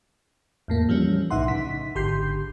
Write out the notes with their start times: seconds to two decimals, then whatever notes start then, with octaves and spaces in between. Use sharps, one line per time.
0.68 E2 A2 A#3
0.89 E3 F3 G3 C#4
1.30 B1 A2 D#4 E5 F#5 C6
1.48 C#3 D#4 B6
1.95 G#1 D3 G4 C6 G6 C7